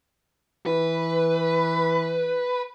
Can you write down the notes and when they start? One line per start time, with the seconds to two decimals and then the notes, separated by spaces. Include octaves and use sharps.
0.66 E3 B4